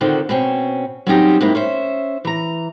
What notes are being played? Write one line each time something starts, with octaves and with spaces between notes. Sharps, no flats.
D3 D#3 C4 D#4 F4 F#4
B2 C4 C#4
F#3 G3 C4 C#4 D#4 G4
G#2 G#3 A#3 C4 E4 G4
C#4 C5 E5
E3 A#5